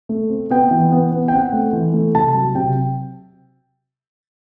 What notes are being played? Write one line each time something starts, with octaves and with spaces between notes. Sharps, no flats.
A3
C4
B3 G5
E3
B3
B3
G5
C4 F#5
A3
E3
A3
C3 A5
F#3
C3 G5